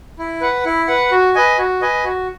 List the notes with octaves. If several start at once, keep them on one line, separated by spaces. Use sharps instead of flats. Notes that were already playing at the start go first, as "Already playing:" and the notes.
E4
B4 F#5
E4
B4 F#5
F#4
B4 D#5 G#5
F#4
B4 D#5 G#5
F#4